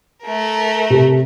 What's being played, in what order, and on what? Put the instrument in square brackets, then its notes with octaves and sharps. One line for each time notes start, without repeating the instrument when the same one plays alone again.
[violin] A3 A#4
[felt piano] C3